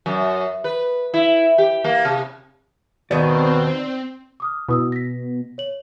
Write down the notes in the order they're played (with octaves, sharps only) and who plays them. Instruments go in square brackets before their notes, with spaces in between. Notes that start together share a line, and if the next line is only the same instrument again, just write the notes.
[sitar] F#2
B4
E4
G4
A#3
C3
[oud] D#2 D#3 [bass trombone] B2 [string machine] C4 [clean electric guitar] D5
[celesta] D6 D#6 F6
[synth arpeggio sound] B2 [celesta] E4 D#6 E6
[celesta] A#6 B6
C#5 F#7